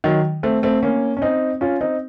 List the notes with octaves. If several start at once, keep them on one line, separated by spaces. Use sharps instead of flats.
D#3 F#3
A3 C4
A3 C4
A#3 C#4
C#4
C4 D#4
C#4 F4
C4 D#4